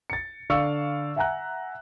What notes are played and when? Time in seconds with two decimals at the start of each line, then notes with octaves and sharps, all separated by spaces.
0.10 A6 C#7
0.50 D3 D5 F5 C#6 E6 C#7
1.16 E5 F#5 G#5 A#5 F#6